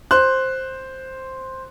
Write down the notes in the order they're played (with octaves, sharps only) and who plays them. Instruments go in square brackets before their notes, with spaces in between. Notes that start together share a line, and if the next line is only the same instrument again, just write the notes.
[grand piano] C5 F#6